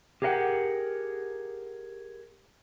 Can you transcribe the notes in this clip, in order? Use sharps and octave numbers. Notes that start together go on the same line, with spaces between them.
G4 G#4 A#4 D#5 F#5 G5